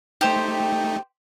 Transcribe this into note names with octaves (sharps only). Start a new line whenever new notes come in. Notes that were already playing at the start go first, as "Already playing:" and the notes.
A3 D#4 G4 C5